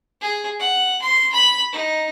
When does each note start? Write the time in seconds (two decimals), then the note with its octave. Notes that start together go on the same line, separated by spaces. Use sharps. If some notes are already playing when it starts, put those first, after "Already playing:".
0.21 G#4
0.60 F#5
1.02 C6
1.32 B5
1.72 D#4